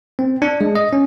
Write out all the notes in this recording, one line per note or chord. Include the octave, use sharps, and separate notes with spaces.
C4
D4
G#3
D#5
C#4